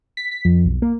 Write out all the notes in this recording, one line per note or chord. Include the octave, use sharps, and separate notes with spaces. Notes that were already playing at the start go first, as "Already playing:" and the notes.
B6
B6
F2
B1
A#3